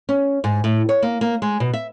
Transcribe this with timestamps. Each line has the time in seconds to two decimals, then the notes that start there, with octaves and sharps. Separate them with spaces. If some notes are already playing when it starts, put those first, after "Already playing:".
0.09 C#4
0.44 G#2
0.64 A2
0.89 C#5
1.02 A#3
1.21 A#3
1.42 G#3
1.60 B2
1.73 E5